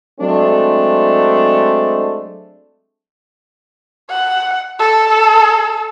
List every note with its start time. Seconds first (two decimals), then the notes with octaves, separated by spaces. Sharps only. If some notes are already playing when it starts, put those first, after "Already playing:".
0.20 F#3 G#3 A3 C4 D4
4.10 F#5
4.79 A4